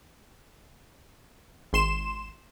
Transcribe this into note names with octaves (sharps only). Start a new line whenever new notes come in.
G#1 C6 E7